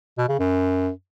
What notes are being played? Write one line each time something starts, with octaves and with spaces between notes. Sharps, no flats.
B2
C#3
F#2